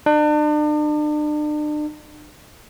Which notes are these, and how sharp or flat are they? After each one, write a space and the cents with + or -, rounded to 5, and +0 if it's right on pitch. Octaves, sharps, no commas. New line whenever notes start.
D4 +40